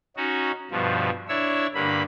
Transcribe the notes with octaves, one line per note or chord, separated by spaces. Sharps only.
C#4 D#4 F#4
G2 B2 F3
D4 E4 C#5 E6
G2 D3 A#3 B5